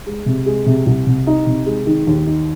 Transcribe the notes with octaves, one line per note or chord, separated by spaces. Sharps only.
G#3
C3
G#3
C3
C2
C3
D#4
C3
G#3
D#3
D#2
D#4